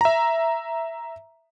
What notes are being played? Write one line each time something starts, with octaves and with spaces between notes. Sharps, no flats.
E5 A#5